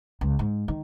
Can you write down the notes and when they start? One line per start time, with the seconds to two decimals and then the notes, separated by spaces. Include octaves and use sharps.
0.21 C#2
0.39 G#2
0.68 D#3